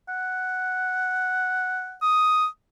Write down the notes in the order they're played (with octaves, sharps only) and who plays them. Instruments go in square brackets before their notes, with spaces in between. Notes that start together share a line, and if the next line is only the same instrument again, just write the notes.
[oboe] F#5
D#6